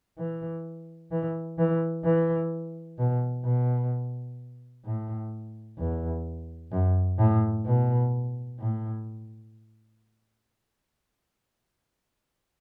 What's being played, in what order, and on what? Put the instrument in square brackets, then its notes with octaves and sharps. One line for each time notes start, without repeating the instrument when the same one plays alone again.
[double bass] E3
E3
E3
E3
B2
B2
A2
E2
F#2
A2
B2
A2